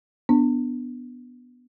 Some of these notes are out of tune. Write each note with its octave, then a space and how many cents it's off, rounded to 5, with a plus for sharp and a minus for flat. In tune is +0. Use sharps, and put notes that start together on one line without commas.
B3 +0 D4 +0